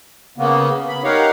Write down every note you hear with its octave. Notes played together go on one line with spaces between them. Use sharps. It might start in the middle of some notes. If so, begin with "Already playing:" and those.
C#3 A#3 B3
B5
D#4 G4 A#4 C#5 F5 F#5